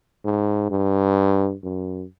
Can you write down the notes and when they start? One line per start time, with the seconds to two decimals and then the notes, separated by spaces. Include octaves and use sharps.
0.24 G#2
0.71 G2
1.63 F#2